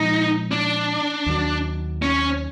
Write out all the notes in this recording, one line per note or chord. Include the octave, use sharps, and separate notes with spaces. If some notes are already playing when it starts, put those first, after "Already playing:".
Already playing: A#2 F3 G#3 B3 D#4
D4
D#2 D#3 F#3
C#4